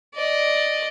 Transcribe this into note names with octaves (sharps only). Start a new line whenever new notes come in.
D5 D#5